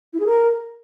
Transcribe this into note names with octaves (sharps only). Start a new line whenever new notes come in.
E4
G#4
A#4